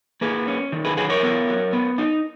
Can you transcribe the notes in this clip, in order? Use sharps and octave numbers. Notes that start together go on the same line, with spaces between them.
A#3 G#4 B4
C#4
D#3
G#4 B4
F#3 G#4 B4
A#4 C#5
B3
F#3
B3
D#4